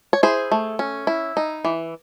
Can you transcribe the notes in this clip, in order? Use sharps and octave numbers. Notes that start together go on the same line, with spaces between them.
C#5
E4 G#4 C5
A3
C#4
E4
D#4
E3